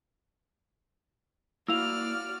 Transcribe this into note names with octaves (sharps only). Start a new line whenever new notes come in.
A#3 E4 F#4 D5 F5 E6 F6 F7